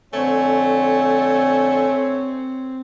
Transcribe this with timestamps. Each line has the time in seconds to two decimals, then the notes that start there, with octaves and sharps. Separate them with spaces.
0.13 F2 D3 A3 C4 C#5 G#5